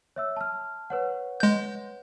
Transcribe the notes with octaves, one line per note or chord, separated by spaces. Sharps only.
C#5 E5 E6
A5 F6
B4 C#5 F#5
G#3 G6